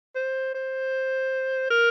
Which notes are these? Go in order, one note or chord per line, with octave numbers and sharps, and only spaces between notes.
C5
C5
A#4